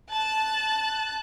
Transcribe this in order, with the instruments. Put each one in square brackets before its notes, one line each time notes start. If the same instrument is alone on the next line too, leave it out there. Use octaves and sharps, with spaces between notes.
[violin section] A5 F#6